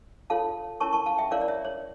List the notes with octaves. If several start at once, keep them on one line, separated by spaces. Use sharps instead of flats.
F4 A4 C#5 F5 A5
C#4 E4 A#4 C#5 A5 C#6
A5 C#6
F5 A5
E5 G5
C#4 E4 A#4 C#5 D5 F5
D5
C#5 E5
C#5